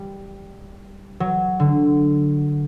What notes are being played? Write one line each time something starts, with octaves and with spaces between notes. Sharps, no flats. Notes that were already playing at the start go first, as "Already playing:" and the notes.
Already playing: G3
F#3
D3